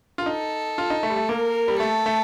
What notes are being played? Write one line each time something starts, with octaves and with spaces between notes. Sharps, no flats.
F4
D#4 A4
F4
D#4
A3
G3
A3
A#3 A#4
G3
A3 A4
A3